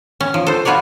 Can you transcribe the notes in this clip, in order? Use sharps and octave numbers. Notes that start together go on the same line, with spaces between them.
C#4
F3
A4 C5
F4 F#4 B4 C#5 D5